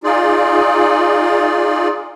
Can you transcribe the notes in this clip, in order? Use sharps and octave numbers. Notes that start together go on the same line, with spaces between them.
D#4 F4 G#4 D5